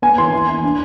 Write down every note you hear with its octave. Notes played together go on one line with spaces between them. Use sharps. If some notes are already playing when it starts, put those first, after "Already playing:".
B3 G#5
E3 C6
E3
E3
D4